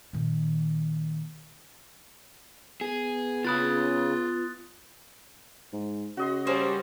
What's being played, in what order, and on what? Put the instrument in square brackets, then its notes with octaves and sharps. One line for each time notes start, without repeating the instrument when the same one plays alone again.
[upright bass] A#2 D#3
[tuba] B3 [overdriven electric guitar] G#4
[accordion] C#3 [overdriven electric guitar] F4 B5 [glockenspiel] D#6 F#6 A6
[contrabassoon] G#2
[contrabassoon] C#3 [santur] F#4 D#5 C6
[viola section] G3 C#4 [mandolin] A#3 C5